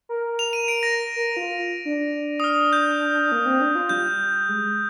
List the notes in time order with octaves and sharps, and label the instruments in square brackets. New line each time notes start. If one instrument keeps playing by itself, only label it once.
[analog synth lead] A#4
[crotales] F7
D#7
D7
A#6
[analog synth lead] A#4
F4
D4
[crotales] D#6
F6
G6
[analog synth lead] A#3
C4
D4
F4
[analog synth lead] G3 [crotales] G6
[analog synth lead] G#3